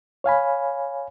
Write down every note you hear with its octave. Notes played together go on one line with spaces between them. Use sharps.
C#5 F5 G#5 B5